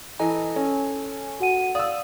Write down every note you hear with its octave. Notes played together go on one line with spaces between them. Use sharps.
E3 A4 D#5 G#5 A#5
C#4 A4
F#4 F#5 D#7
D5 F5 D#6 E6